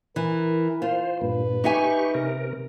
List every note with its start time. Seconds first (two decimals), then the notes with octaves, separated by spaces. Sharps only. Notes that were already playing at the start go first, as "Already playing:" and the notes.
0.16 E3 A#4
0.82 F4 C5
1.21 G2 A#2 B4
1.64 D#4 G4 E5 G#5 C#6
2.15 C3 A#4